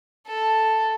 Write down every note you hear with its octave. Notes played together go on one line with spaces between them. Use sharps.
A4